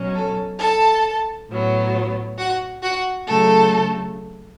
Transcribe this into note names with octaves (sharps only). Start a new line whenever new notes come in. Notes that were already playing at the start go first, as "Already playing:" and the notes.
Already playing: B2 F#3 C#4
A4
A4 A5
A2 F#3 B3
F#4 F#5
F#4 F#5
C#3 F#3 A3 A4 A5